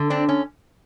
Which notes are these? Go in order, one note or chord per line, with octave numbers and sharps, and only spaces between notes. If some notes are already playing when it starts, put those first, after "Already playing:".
Already playing: D3
C4 D4
C#4